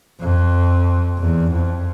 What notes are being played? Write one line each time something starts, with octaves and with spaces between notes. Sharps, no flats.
F2
E2
F2